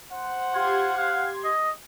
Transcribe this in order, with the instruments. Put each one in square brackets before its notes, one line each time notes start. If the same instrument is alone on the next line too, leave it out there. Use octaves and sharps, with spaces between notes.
[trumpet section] C5 F#5
[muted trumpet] F4 [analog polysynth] G4 C6 G#6
[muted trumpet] F5
D#5